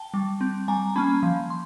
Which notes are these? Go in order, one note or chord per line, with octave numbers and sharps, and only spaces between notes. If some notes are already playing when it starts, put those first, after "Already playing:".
Already playing: G5 A5
G3
C4
G3 G#5 A#5
A#3 C#4 A5 B5
F3
C6